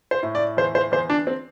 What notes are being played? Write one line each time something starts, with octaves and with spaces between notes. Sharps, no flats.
C5
A2
D5
E2 C5
C5
E2 C5
D4
C4